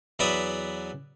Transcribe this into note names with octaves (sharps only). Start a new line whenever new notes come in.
E2 F#3 B4 D5 E5 D#6